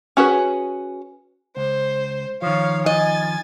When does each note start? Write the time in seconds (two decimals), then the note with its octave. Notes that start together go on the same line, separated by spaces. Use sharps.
0.17 C#4 F#4 G#4 B4
1.57 C#2 C5
2.42 D#3 F3 C#5 F5
2.86 D#5 G#5 A6